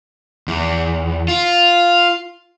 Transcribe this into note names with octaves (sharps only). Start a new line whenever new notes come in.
E2
F4